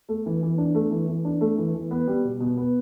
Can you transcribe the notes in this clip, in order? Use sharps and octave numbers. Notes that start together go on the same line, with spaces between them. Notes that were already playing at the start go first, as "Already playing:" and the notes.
A3
E3
E3
D4
A3
E3
E3
D4
A3
E3
E3
B3
G3
B2
B2
B3